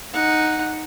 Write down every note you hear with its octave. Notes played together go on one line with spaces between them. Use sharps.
D#4 F#5